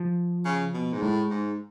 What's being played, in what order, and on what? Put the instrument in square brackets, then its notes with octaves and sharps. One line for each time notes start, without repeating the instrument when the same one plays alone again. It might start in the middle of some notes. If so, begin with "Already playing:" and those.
Already playing: [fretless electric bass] F3
[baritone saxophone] C#3
B2
G#2
[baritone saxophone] A2 [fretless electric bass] G#3
[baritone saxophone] G#2